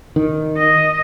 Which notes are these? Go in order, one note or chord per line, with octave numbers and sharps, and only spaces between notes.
D#3
D#5